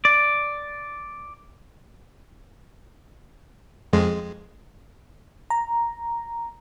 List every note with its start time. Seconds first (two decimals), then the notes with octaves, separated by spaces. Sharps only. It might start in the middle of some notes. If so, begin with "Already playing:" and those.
0.05 D5
3.93 F2 G#3
5.50 A#5